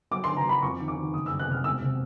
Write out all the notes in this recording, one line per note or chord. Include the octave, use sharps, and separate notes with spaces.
F#3 D6
D3 C6
A#5
F#3 B5
F2 C#6
D#3
D6
D#3
F#1 D#6
F#1 E6
F#6
C3 F6
E1 E6
C3